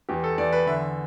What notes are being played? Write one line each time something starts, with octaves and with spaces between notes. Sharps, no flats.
E2 G4
A4
E2 D5
B4
D3 E5